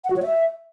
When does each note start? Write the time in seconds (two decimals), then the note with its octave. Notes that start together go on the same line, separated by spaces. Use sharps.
0.04 F#5
0.10 F#4
0.16 C#5
0.22 E5